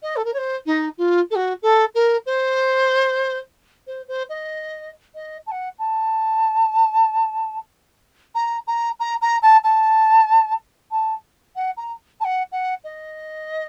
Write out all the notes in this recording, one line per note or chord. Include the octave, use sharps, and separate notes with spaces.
D#5
A4
A#4
C#5
C5
D#4
F4
A4
F#4
A4
A#4
C5
C5
C5
D#5
D#5
A5
F#5
A5
A#5
A#5
A#5
A#5
A5
A5
A5
F#5
A#5
A5
F#5
F#5
D#5